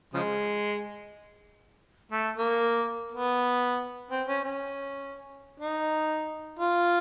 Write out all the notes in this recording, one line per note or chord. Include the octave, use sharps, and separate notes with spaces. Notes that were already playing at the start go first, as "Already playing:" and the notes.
C#3 F3 G#3
A3
A#3
B3
C4
C#4
C#4
D#4
F4